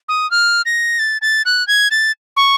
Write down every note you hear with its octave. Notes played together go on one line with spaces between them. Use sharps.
D#6
F6
A#6
A6
A6
F#6
G#6
A6
C#6